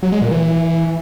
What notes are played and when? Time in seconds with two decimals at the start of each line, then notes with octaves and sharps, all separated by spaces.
0.03 F#3
0.12 G#3
0.22 A#2
0.31 E3